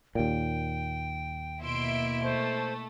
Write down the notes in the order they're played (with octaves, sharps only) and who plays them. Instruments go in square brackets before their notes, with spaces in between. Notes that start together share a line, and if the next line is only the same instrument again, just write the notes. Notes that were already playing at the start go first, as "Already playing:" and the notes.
[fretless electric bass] D#2 A#2 [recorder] G5
[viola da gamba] B2 A#3 E4 [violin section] E5 C6 D7
[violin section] A3 [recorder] C5